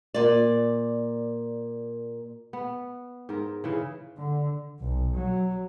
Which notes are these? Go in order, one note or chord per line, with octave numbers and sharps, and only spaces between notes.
A#2 D5
B3
G#2 A#4
C#3 E3
D3
B1
F#3